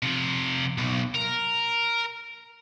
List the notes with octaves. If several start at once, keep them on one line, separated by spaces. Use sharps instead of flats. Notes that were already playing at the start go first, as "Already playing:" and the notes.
C3 F3
B1
A#4